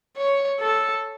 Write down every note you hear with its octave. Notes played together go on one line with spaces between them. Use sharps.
C#5
A4